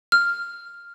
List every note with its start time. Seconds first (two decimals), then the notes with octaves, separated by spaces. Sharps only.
0.12 F6